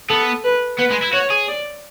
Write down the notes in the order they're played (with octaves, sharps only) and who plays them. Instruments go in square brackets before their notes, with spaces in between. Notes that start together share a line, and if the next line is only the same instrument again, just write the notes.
[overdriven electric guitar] B3 [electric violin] A4
[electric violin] B4
[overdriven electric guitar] B3 [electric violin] B4
[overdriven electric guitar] G#3
E4
[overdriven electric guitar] F#4 [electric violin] C#5
[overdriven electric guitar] G#4
[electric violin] D5